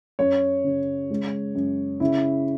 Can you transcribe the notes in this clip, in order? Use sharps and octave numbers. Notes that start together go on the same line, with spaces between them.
F#2 C#5
C#3
G#3
F#2
C#3 E4